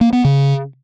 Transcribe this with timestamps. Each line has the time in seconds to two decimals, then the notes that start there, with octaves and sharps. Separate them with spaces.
0.01 A#3
0.13 B3
0.24 C#3